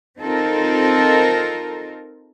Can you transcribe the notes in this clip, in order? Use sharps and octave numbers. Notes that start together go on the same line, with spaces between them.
C4 D#4 F4 A4 A#4